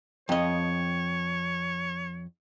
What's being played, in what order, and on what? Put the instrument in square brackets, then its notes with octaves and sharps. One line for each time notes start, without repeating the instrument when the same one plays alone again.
[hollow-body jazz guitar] F2 D#5 [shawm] C#5